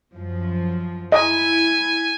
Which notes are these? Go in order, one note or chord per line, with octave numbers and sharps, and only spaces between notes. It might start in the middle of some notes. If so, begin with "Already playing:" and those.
F#2 F3
E4 D#5 G#5